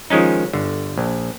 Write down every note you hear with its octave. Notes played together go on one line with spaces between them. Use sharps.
D#3 F3 G#3 C#4 D#4
G1 D3
A#1